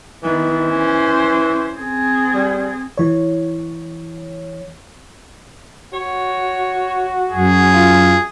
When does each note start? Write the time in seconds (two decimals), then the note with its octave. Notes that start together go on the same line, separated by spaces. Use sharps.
0.23 D#3 E3 B3
0.68 C#4 C5
1.77 C4 G#4
2.34 G3
2.98 E3 C#5
5.93 F#4 C#5
7.31 F#2 G#4
7.74 F4